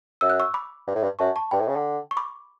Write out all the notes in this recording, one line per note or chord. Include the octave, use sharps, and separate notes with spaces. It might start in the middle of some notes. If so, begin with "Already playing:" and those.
F#2 E6
F#6
C#6 E6
B5 D6
G2
A2
G2
F#2 A5 C#6
A5 C#6
G2 G5 B5
A2
C#3
D3
C#6
B5 D6